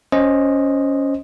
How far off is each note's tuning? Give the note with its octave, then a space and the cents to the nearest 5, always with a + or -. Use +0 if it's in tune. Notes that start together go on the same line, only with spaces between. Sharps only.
C#4 +0 C5 +10 D#5 +0